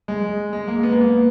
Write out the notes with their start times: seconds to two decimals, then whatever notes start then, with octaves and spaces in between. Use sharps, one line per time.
0.08 G#3
0.53 G#3
0.68 A#3
0.83 B3
0.92 A#3
1.01 B3